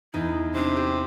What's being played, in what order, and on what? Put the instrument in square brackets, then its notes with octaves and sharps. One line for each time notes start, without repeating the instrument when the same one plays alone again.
[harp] E2 D#4 [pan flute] E4
[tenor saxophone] C3 [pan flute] D4
[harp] G4